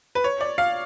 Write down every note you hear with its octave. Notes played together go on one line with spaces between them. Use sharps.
B4
C#5
D5
F5